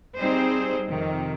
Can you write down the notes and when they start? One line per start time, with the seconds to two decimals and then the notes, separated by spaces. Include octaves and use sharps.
0.18 G3 C4 D#4 G#4 C5
0.88 F2 C3 D#3